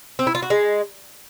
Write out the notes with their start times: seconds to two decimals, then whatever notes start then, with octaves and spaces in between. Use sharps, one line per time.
0.19 C4
0.27 E4
0.35 F4
0.42 F#4
0.50 G#3